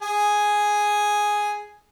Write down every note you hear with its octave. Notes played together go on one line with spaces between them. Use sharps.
G#4 G#5